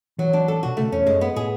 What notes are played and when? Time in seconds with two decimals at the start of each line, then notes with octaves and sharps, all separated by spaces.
0.18 E3 F#3
0.33 D4
0.48 A4
0.63 B2 F#4
0.77 C#3 A3
0.92 E2 C#4
1.06 F#2 G#3
1.21 B3
1.36 A2 G#4